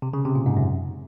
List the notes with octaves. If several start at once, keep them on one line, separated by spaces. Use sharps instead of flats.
C3
C#3
C3
A#2
G#2
F#2